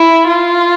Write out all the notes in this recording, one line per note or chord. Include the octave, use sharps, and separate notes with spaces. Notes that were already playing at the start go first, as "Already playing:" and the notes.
Already playing: E4
F4